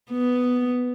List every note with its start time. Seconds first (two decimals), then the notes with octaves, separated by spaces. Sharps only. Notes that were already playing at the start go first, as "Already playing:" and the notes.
0.11 B3